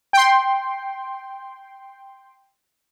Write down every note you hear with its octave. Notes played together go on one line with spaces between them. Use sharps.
G5 C6